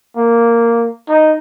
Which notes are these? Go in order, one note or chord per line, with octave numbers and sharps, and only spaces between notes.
A#3
D#4